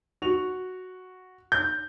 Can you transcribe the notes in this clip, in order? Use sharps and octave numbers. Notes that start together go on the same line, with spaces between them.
F#4 F7
G6